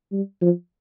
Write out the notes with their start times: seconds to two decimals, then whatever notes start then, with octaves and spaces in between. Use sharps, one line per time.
0.12 G3
0.41 F3